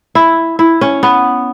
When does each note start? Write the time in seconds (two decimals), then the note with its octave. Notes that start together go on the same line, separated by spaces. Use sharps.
0.15 E4
0.59 E4
0.81 C#4
1.03 B3